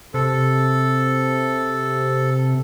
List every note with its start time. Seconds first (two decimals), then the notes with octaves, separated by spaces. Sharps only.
0.14 C3 A4